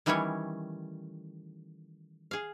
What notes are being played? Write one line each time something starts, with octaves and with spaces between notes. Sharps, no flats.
D#3 E3 G3 A3 C#4 C#5
G#4 F5